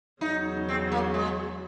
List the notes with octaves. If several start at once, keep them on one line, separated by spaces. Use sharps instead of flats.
E2 C#3 F#3 D#4
C4
A#3
G#3